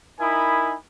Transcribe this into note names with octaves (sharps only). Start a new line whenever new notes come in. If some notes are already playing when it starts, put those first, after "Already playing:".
D#4 E4 A#4 G#5 B5 D#6